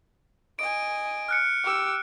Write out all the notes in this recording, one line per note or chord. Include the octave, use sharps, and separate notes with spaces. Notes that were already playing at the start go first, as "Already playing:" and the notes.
D#5 G#5 D7
F6 F#6 C#7
G4 E6